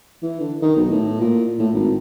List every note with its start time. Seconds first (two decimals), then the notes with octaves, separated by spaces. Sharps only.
0.23 E3
0.40 D3
0.62 D#3
0.76 B1
0.91 A2
1.20 A#2
1.59 A2
1.74 G#1